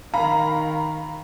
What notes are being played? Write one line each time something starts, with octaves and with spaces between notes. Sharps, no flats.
D#3 F5 A#5 B5